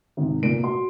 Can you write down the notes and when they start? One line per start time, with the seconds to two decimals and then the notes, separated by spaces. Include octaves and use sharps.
0.17 G#1 C3
0.42 F1 A#1 A#2 D7
0.63 F#4 C6